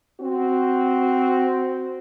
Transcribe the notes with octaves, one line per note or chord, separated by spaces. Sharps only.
C4 F#4